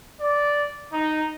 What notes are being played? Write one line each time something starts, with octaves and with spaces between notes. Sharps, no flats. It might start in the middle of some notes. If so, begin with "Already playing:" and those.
D5
D#4